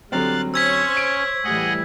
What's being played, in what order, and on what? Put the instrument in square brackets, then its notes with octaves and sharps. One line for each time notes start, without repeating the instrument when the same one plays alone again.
[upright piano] D3 F#3 C4 [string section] G3 [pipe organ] F5 F#6 A6
[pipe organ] C#4 [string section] C5 C#5 C#6 [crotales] E6 G#6 B6
[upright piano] D7
[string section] A2 E3 G3 [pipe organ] G#4 D#5 F#5